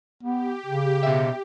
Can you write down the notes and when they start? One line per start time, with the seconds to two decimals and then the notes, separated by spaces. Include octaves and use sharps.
0.23 B3 G4
0.66 C#3
1.03 B2 E5